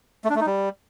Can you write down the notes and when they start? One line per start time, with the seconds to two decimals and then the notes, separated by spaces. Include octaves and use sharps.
0.24 A3
0.30 D4
0.35 A3
0.41 D#4
0.46 G3